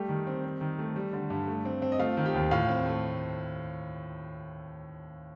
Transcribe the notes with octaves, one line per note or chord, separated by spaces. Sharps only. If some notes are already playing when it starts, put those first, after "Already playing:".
Already playing: G3 A3 G4
D#3
C4
C4
D#3
A3
G3
D3
G2
A3
C4
C4
D#5
A3 F4 F5
D#3
G4 G5
D#2
A2 F4 F5
C4
A3